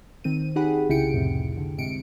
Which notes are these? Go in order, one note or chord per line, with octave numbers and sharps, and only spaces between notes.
D#3 C4 D#7
D#4 G4 G#4 F#5 B5
C2 C#3 E4 G5 C#7 D7
C2 F2 A2 C3
D3
G#2 C3 C#7 D7